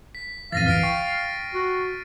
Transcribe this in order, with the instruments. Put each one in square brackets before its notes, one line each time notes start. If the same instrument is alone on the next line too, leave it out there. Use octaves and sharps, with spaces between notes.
[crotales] B6
[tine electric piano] F2 A2 E3 [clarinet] F5 [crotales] A6 A#6 D#7
[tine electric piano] G1 C2 E3 [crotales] F6 C7 D7
[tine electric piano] G5 C#6
[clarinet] F#4